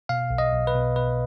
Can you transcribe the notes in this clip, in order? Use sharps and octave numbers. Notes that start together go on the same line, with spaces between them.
B2 F5
B1
D#5
B1
B4
B2
B2 B4